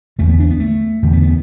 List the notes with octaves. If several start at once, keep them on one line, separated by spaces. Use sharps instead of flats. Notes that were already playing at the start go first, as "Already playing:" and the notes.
E2 D3 A3
B3
D4
B3
A3
E2 D3
B3
B3